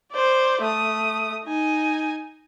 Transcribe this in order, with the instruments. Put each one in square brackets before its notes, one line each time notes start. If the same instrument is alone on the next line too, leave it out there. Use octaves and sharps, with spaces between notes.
[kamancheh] C5 D5
A3 D#6
D#4 G#5